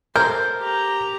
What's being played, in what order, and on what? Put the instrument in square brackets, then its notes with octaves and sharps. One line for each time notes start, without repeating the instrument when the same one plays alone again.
[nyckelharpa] A4 C5 [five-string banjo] A#4 [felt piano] G6
[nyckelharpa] G4 A#5